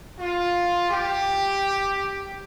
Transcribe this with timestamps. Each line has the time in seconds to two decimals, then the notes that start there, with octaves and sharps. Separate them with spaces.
0.20 F4
0.89 G4